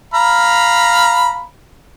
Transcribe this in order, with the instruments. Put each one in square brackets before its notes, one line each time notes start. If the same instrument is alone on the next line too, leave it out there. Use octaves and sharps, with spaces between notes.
[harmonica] F5 A#5 B5